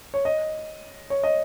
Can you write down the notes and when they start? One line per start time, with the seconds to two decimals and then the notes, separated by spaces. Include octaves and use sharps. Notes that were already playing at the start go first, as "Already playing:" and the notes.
0.14 C#5
0.25 D#5
1.10 C#5
1.24 D#5